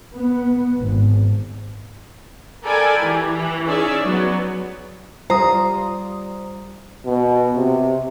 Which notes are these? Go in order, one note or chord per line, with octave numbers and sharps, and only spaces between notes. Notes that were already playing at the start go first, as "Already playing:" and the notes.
B3
G#1
A4 A#4 D5 G5 G#5 B5
E3 G4
E3
C#4 D#4 G#4 C#5 D5 E5
F#3 B3
G3 F4 C5 A#5 D#6
B2
C3